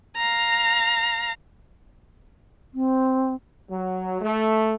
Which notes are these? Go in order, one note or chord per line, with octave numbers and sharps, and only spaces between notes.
F5 A#5
C4
F#3
A3